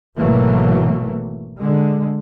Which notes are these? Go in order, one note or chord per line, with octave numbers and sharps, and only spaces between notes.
G#1 B2 E3 F#3 A3 A#3
D3 G#3